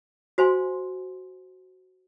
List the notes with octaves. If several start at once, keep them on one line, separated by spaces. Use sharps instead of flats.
F#4 C5 F5 G#5 C6